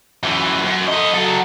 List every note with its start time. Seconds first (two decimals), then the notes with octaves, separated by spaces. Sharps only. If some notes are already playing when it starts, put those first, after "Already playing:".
0.23 F#2 E3
0.65 F#2
0.88 A4 D#5
1.15 F#3 A4